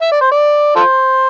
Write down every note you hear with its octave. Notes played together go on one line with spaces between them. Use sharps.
E5
D5
C5
D5
F4 A4 C5